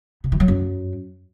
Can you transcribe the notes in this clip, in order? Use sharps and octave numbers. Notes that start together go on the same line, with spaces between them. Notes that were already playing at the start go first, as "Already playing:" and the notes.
C3
E3
F#3
F#2